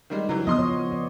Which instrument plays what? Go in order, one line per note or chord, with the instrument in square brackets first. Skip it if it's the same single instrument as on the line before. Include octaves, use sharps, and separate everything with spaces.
[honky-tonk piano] D#3 G3 G#3
[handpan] C#3 [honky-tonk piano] E3 F#3
[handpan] F3 B3 [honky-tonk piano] D#5 C6 D#6
[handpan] C#5
D5